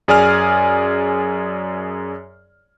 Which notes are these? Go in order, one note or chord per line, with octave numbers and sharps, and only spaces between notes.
F#2 G#4 D5 G#5 F6